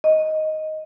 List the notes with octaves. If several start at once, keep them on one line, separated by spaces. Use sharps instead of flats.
D#5